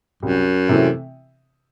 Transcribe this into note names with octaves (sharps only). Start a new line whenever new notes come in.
C2 F#2
C3 E3 A3 C4